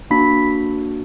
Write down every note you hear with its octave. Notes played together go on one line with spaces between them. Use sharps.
A#3 D4 F#4 B5 B6